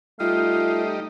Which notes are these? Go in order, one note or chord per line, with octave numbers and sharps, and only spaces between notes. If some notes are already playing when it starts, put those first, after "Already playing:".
G3 A3 D#4 F4 F5